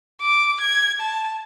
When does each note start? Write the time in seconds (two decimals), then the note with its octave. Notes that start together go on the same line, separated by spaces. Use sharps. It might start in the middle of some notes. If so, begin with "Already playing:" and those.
0.21 D6
0.61 G#6
1.00 A5